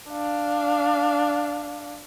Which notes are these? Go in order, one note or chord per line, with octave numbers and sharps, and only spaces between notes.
D4 F5